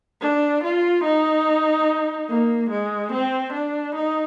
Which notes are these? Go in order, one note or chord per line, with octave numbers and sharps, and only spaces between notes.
D4
F4
D#4
A#3
G#3
C4
D4
D#4